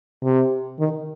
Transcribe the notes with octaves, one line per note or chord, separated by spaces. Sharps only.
C3
D#3